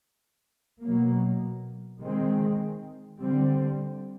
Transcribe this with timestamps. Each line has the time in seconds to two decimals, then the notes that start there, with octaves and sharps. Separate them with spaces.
0.82 B2 F#3 A#3
2.00 D#3 G#3 C4
3.20 D3 G3 C4